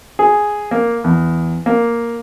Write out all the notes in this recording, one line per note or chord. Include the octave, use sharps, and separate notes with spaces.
G#4
A#3
E2
A#3